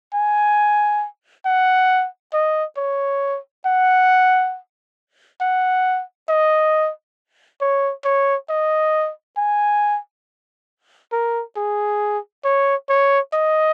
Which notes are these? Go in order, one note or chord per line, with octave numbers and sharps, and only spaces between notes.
G#5
F#5
D#5
C#5
F#5
F#5
D#5
C#5
C#5
D#5
G#5
A#4
G#4
C#5
C#5
D#5